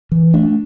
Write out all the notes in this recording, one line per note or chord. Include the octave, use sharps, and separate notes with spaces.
E3
A3 D4